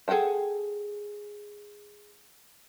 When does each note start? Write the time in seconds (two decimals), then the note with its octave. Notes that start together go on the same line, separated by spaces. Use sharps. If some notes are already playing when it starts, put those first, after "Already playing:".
0.08 G#4 A4 F#5 G5 A5